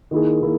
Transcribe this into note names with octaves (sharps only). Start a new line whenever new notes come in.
D#3 A#3 E4 G#4
D#3 A#3 E4